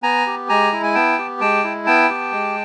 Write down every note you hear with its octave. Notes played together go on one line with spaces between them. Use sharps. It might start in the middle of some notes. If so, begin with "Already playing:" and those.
B3 G#5 A#5
G4
G#3 G#5 A#5
E4
G#5
B3 G5 A5
G4
G#3 G5 A5
E4
B3 G5 A5
G4
G#3